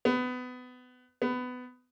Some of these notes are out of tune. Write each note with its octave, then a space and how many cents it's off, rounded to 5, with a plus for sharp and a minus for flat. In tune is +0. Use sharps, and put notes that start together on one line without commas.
B3 +25
B3 +20